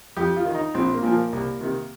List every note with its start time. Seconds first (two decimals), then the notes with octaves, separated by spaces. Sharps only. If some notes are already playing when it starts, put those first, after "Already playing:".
0.17 F2 G4
0.36 F4
0.45 D#3
0.55 D#4
0.74 A#1 C4
0.94 A#3
1.03 A#2 F3
1.13 A#3
1.33 C2
1.61 C3 D#3